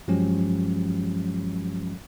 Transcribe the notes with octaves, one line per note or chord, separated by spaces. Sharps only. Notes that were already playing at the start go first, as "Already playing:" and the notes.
G2 F3 F#3 G#3 C#4 G4